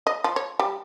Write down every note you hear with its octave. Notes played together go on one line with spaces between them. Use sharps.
D#5
F3
C#5
G3